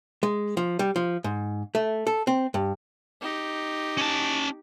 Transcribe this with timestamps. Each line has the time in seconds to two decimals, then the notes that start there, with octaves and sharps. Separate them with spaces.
0.23 G#3
0.57 F3
0.79 G3
0.96 F3
1.24 G#2
1.75 A3
2.07 A4
2.27 C4
2.54 G2
3.22 D#4 G4
3.97 C#4 A5